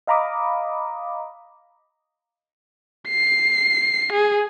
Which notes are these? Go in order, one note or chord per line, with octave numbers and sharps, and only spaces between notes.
D#5 F5 A#5 B5 D6 D#6
C7
G#4